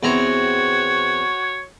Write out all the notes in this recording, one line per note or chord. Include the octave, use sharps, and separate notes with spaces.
E2 C4 F#4 C#5 A#5